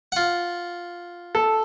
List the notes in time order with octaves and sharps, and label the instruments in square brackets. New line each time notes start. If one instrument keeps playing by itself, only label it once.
[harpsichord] F4 F#5
[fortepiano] A4